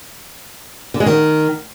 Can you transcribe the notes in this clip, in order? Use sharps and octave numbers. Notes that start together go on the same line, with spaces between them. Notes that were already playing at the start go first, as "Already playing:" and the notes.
D3
G#3
D#3